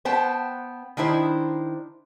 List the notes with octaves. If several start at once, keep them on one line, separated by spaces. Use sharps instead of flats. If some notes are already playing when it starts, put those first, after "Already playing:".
B3 C5 G5 A5
D#3 D4 E4 C5